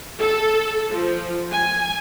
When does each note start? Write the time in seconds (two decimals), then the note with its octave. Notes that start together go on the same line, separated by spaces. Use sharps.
0.20 A4
0.91 F3
1.52 G#5